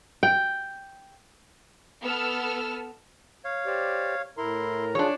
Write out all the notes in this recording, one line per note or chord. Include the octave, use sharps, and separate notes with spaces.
G5
B3 A4 E6 F6
C#5 F5
G4 C5 D5
A2 E4 A#4 A#5 C6
D4 F4 G#4 C#5